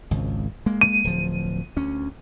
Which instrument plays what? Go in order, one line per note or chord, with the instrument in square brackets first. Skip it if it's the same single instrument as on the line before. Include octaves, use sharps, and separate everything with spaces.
[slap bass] G#1 C#2
G#3 A#3
[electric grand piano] D#7
[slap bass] D1 F3
D2 C#4